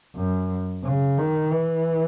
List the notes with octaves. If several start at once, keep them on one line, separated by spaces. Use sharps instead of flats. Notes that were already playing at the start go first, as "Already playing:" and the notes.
F#2
C#3
D#3
E3